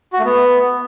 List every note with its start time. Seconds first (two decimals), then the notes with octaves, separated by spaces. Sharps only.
0.13 F#4
0.19 A3
0.25 B3